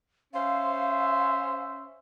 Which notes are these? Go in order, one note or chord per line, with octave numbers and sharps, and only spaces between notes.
C#4 C5 E5 F5